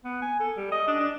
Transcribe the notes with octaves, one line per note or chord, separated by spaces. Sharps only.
B3
G#5
A4
G3
D#5
D4
D4